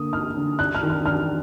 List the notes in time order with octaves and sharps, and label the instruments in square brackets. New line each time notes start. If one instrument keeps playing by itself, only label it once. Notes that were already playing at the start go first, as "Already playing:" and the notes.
Already playing: [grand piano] D3 A#3 [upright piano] D#6
[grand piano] D#4 [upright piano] F6
[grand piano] D3
[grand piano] D4 [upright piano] F#6
[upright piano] F6
[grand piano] D#3
[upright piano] F6
[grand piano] D4 [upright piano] F6